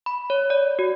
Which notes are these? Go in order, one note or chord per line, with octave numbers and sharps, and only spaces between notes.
B5
C#5
D5
F#4